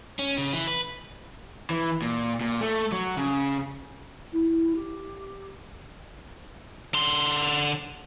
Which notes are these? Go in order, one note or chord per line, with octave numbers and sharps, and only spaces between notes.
C#4
C#3
E3
B4
E3
A#2
A#2
A3
F#3
C#3
E4
G4
D3 C6